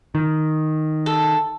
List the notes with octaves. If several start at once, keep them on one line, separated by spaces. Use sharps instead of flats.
D#3
A4